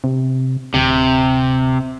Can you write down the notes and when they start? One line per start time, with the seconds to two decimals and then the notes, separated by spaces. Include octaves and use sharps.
0.04 C3
0.74 D1 C3